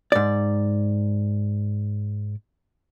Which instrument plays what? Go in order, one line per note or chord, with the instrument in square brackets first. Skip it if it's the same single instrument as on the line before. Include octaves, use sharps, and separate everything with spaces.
[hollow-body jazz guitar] G#2 D5